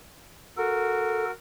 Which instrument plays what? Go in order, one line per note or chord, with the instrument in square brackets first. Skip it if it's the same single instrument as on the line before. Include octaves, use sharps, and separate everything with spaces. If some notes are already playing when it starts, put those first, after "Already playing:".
[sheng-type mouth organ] F#4 A#4 [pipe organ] A4